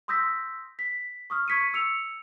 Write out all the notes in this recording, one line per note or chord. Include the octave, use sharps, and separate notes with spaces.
C6 D#6 E6 G6 A#6 B6
B6
C#6 D#6 F6
C#6 G#6 B6 C#7 D#7
E6 C#7 F7